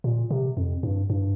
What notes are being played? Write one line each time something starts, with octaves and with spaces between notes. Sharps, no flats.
A#2
C3
F2
G2
G2